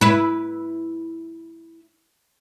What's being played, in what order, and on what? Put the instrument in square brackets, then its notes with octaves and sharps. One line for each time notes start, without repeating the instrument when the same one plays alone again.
[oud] E4 B4